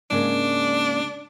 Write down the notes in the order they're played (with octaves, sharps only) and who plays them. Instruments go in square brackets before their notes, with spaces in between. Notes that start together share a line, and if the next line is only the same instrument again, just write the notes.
[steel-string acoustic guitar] G#2 C#3 A#3 [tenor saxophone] D4